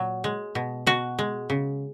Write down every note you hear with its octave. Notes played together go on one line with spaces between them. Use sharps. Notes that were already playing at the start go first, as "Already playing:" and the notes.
Already playing: A#2 F#3
G#3
B2
B2 F#4
G#3
C#3